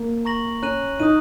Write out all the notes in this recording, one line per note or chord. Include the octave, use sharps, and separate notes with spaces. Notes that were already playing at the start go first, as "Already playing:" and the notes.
Already playing: A#3
A#5 C#6 A#6 F#7
C#4 A#5 F#6 D#7 F#7
D#4 D#6 F#6 D#7